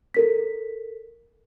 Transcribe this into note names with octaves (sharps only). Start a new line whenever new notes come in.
A4 A#4 B6